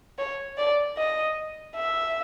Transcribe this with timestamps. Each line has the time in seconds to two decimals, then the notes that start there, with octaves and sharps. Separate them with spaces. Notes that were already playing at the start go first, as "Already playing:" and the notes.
0.18 C#5
0.58 D5
0.97 D#5
1.76 E5